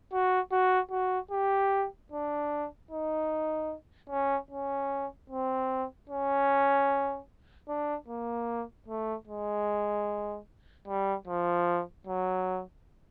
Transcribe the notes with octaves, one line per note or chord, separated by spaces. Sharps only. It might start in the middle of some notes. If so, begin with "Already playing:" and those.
F#4
F#4
F#4
G4
D4
D#4
C#4
C#4
C4
C#4
D4
A#3
A3
G#3
G3
F3
F#3